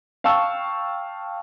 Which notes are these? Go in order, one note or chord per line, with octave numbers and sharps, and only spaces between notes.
F5 G5 A5 C#6 E6